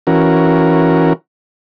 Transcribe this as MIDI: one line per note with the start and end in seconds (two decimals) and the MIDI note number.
0.07 1.13 52
0.07 1.13 61
0.07 1.13 66
0.07 1.13 70